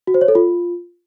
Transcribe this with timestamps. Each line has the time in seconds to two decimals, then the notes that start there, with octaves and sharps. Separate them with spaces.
0.07 F#4
0.14 C5
0.21 C#5
0.28 A4
0.35 F4